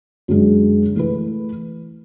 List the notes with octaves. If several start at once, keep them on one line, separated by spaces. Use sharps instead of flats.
F#2 D3 G#3
E3 A3 E4 B4